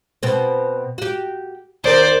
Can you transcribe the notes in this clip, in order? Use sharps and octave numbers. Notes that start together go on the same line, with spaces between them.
B2 B3 C4
F#4 G4
D#2 A#4 C5 D5